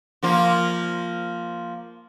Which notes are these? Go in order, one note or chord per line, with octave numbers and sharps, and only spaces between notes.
F3 A#3 F4